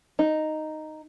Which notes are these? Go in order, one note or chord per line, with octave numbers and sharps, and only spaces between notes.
D#4